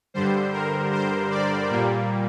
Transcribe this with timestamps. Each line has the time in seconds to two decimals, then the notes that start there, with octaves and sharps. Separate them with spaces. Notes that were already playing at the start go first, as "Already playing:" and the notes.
0.14 G2 D3 G3 C5
0.53 A#4
0.93 C5
1.31 D5
1.70 A#2 G3 A#3